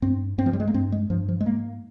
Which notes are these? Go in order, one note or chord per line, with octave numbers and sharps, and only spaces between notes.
G2 C4
G2 C4
F3
G3
G#3
A#3
G2 C4
G#3
G2 F3
F3
G#3
G#2 A#3